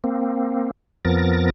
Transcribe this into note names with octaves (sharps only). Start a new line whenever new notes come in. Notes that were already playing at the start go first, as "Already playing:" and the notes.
A#3 C4
F2 F3 B3 A#4 A6 A#6